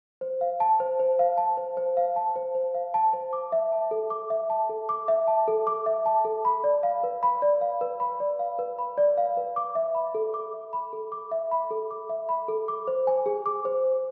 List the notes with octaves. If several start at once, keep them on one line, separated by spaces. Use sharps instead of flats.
C5
F5
A5
C5
C5
F5
A5
C5
C5
F5
A5
C5
C5
F5
A5
C5
D6
E5
A5
A4
D6
E5
A5
A4
D6
E5
A5
A4
D6
E5
A5
A4
B5
D5
F5
B4
B5
D5
F5
B4
B5
D5
F5
B4
B5
D5
F5
B4
D6
E5
B5
A4
D6
E5
B5
A4
D6
E5
B5
A4
D6
E5
B5
A4
D6
C5
G#5
G#4
D6
C5